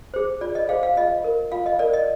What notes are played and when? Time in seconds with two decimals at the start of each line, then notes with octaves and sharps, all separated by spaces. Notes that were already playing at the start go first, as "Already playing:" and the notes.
0.14 G#4 C5
0.41 F4 D5
0.55 D#5
0.69 G#4 C5 F5
0.83 F5
0.97 F4 D#5
1.24 A#4
1.52 F4 F5
1.66 D#5
1.79 A#4 D5
1.94 D#5